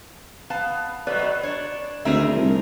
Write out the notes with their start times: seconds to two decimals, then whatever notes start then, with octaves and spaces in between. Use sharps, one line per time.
0.50 B3 F5 A5
1.07 B2 F#3 A3 B4 D5
1.43 D4 C#5
2.05 D2 D#3 A3 C4 G#4 A#4 E5
2.36 C2